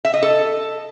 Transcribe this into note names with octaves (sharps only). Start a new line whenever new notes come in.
E5
D#5
A4